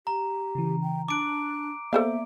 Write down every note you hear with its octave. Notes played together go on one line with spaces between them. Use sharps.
G4 A#5
C#3 E3
G5
D4 A5 D6 F#6 D7
A#3 B3 A4 C5 D5 E5 F5